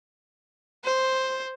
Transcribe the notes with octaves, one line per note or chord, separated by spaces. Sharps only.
C5